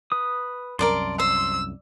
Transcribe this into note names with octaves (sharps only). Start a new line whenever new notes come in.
B4 D#6
C2 F#2 A#4 D5 A5 C6
C5 E6